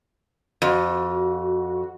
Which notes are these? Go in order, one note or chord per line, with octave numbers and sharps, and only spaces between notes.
F2 F#4